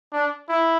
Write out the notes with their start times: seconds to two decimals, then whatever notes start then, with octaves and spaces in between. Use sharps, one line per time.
0.13 D4
0.49 E4